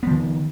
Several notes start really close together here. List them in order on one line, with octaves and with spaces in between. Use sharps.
B3 F3 D#3